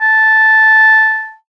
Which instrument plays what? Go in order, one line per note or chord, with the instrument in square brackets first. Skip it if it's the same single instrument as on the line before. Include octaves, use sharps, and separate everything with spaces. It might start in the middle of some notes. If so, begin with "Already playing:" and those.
[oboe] A5